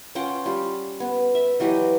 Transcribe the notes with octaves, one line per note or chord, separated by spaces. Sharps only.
C#4 F4 F#5 G5
G3 F4
B3
E5
E3 F#3 G4 D#5